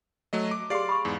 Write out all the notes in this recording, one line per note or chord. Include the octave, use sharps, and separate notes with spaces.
F#3 A3 D#5
D6
G4 G#4 D5 F5 C6 C7
B5 C#6
E2 G#2